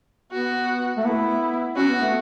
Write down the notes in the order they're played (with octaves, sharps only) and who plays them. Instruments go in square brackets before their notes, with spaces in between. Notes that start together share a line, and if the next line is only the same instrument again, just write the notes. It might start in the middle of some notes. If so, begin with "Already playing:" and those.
[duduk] B3 [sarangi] F#4
[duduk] A3
[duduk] B3 [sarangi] E4
[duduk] C#4 [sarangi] F#4
[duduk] B3
A3